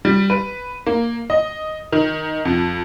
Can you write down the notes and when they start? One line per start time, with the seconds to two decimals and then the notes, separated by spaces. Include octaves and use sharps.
0.05 G3
0.30 B4
0.86 A#3
1.30 D#5
1.92 D#3
2.45 F2